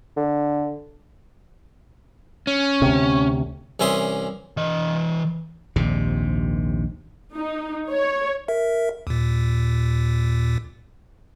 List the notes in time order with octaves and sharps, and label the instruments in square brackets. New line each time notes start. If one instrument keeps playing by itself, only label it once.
[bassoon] D3
[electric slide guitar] C#4
[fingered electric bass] D2 C3
[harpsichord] C2 E3 C#4 E5 C6 D#6
[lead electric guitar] E3 D#5
[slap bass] A#1 D#2 G#2 C3
[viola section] D#4
C#5
[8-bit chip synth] A#4 E5
D#2 A#2